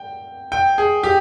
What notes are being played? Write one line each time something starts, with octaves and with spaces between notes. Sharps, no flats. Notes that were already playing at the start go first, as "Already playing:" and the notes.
Already playing: G5
G5
G#4
G4